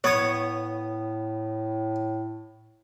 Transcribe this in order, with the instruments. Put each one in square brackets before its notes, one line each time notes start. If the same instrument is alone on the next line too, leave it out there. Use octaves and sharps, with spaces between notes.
[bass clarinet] A2 [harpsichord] B3 D#6 [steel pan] C#5